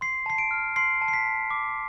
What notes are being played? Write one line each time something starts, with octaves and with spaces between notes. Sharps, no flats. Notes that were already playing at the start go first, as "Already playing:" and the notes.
C6 C7
A5 C7
D7
F6
C6 C7
A5
C7
B6
A5
D6